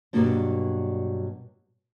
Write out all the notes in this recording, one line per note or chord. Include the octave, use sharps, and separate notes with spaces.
G2 B2 F#3 G3 A#3 D4